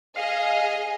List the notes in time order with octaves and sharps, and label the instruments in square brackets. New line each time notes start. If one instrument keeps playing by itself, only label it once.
[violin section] G#4 D#5 [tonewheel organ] F5